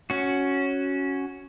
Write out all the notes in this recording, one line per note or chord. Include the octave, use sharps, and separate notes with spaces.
C#4 F#4